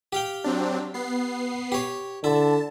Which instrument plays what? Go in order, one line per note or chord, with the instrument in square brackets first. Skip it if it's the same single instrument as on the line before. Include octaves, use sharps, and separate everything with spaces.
[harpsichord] G4 F5 G5
[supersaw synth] F#3 C4 D4
B3 C7
[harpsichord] G4 C#5
[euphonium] D3 [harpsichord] E4 [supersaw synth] A5